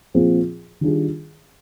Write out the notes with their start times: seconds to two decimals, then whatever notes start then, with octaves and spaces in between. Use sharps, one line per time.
0.14 A#2 F3 C4 F4 G#4
0.81 D#3 G3 D4 F4 G#4